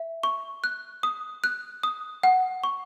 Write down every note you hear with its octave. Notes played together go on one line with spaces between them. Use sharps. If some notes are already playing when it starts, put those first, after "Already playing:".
Already playing: E5
C#6
F#6
D#6
F#6
D#6
F#5
C#6